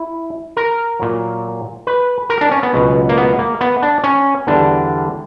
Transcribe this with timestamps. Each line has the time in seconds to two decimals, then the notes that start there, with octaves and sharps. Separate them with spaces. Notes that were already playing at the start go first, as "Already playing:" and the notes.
Already playing: E4
0.57 A#4
1.00 A#2 F#3
1.87 B4
2.30 A#4
2.41 D4
2.51 C#4
2.63 B3
2.73 C#2 B2 F#3
3.09 A#3
3.17 B3
3.39 A#3
3.61 B3
3.82 D4
4.04 C#4
4.47 E2 D3 G3 D4